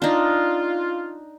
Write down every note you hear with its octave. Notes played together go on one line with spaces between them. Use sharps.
D4 D#4 F4